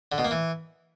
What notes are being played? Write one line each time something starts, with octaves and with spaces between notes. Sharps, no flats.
D3
B2
A#3
E3